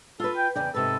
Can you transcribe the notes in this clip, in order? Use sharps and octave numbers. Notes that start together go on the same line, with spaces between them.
F4 A4 B4
G5
E2 C#3 D5 G5
G#2 C3 A4 B4